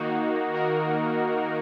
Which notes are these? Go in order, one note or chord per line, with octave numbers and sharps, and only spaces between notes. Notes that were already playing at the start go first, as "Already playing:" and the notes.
Already playing: D#3 A#3 D#4 F#4
F#4 A#4